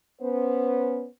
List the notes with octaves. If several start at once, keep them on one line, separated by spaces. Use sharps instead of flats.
B3 C#4 C5